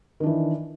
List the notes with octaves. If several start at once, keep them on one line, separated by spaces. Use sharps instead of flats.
D#3 E3 D4